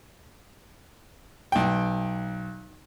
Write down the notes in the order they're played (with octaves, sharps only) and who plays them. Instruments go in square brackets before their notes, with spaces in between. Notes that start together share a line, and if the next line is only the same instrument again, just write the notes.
[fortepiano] B1 G5